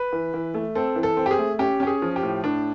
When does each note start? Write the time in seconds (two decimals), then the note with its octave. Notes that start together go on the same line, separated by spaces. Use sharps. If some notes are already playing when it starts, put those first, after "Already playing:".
Already playing: B4
0.12 E3
0.34 E3
0.54 A3
0.75 C4 A4
0.96 E3
1.03 A4
1.17 C4
1.26 G4
1.31 G#4
1.38 A3
1.59 C#4 G4
1.80 C#4 G4
1.87 G#4
2.02 F3
2.16 G4
2.23 A2
2.44 A2 D4